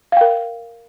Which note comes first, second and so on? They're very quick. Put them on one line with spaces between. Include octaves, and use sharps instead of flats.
F5 G5 A#4